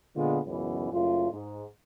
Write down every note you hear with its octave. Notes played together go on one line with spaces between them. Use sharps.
A#2 D3 G#3 B3 F4
C#2 F#2 B2 E3 B3
F#1 F#2 A3 F4
G#2